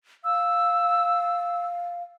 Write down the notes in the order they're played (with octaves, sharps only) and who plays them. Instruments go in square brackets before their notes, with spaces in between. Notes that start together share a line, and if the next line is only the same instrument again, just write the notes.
[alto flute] F5 [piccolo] E6